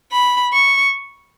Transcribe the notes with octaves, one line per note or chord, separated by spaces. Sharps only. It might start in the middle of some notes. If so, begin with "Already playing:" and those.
B5
C#6